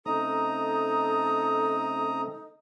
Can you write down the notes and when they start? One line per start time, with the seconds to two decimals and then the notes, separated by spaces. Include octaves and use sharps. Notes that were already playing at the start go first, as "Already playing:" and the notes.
0.06 C#3 A3 C4 D#4 A4 A#5 D#6